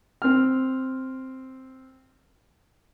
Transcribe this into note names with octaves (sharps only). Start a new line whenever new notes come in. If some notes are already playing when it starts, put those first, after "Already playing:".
C4 F6